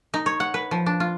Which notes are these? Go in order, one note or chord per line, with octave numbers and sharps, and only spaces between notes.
D#4
C#5
F#5
B4
F3
D4
F4